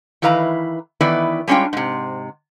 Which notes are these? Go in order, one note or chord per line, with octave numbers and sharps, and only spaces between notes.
D#3 E3 E4 B4 F5 A#5
D#3 E3 B3 E4 B4 D5
G3 G#3 C#4 D4 F4 G5
G#2 C3